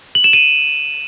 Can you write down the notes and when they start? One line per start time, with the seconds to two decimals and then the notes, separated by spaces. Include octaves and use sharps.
0.15 F#7
0.24 E7
0.33 D#7